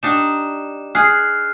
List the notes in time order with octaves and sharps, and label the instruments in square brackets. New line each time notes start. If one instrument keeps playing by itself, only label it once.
[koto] G3 D4 D#4 [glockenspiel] E7
[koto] G#4 [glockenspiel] F6 F#6 C7